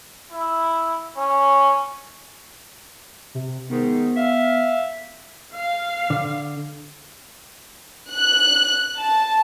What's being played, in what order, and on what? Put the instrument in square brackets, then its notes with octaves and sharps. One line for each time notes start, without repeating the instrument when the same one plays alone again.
[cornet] E4
C#4
[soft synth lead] C3
[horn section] G#2 D#3 [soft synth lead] B3
[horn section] E5 F5
[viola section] F5
[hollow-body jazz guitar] D3
[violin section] F#6
A5